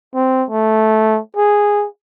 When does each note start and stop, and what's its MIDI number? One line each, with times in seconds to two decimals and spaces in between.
0.15 0.45 60
0.51 1.20 57
1.36 1.87 68